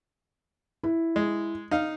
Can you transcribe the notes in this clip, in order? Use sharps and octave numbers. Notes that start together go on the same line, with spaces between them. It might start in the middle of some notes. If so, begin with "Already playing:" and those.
E4
G#3
D#4 F5